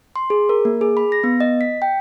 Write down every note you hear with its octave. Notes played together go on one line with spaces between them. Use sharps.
C6
G#4
A#4
A#3
G#4
B5
A#6
B3
D#5
B6
G5